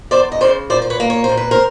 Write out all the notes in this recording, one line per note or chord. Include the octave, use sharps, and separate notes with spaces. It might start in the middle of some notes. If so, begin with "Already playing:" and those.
E2 C5 D5
D#5
C#3 C5 D5
A#2 C5 D5
C5
B4 C#5
A#3
C#5
C5
A#2
B4
A#4 C5